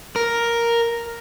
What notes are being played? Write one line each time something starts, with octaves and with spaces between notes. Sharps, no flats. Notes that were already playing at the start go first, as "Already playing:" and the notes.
A#4